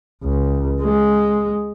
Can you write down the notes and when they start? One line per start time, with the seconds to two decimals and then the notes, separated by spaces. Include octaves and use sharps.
0.24 C#2
0.82 G#3